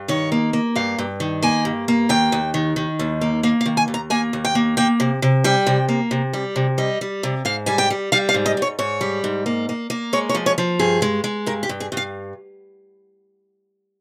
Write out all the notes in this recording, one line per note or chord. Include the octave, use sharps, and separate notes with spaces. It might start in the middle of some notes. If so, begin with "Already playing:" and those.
Already playing: G2
D#3 C#5
A#3
A#3
G2 F5
G2
D#3
A#3 G#5
G2
A#3
D#2 G5
D#2
D#3
D#3
D#2
A#3
A#3 F5
F5
D#3
G#5
D#2
A#5
A#3 G#5
D#2
G5
A#3
A#3 G5
C3
C3
G3 G5
C3
A#3
C3
G3
C3
G3 D#5
G3
C3
G#2 F5
G3 G#5
G5
G3
G3 F5
F5
G#2
D#5
G#2 C#5
G#2 C#5
G3
G#2
A#3
A#3
A#3
G#3 C#5
C#5
F3
C#5
F3
G2 G#4
G#3
G#3
G2 A#4
G4
G2
G#4
G2
F5